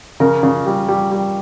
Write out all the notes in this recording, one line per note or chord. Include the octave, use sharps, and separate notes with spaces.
C#3 A#4
C#3
G3
G3
G3